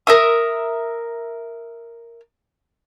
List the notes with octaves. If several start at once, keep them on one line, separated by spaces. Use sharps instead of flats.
A#4 E5 D#6